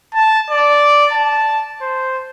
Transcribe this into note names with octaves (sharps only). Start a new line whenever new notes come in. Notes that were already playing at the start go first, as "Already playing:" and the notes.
A5
D5
A5
C5